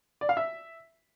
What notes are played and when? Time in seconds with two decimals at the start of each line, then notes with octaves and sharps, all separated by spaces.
0.21 D5
0.29 F5
0.37 E5